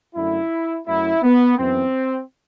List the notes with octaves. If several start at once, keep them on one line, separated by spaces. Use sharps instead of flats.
F#2 D3 A3 E4
F#2 F#3 A3 E4
B3
F#2 E3 B3 C4